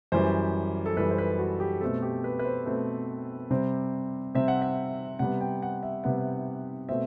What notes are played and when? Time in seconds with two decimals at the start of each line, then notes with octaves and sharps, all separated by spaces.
0.12 F#2 E3 G3 C5
0.86 A4
0.97 F#2 E3 G3 B4
1.11 C5
1.18 B4
1.39 F#4
1.60 G4
1.81 B2 A3 C4 A4
2.02 G4
2.24 B4
2.39 B4
2.45 C5
2.66 B2 A3 C4
3.50 C3 G3 C4
4.35 C3 G3 C4 E5
4.48 F#5
4.62 E5
5.19 C3 G3 B3 F#5
5.41 G5
5.62 F#5
5.83 E5
6.04 C3 G3 B3 F#5
6.89 B2 A3 C4 E5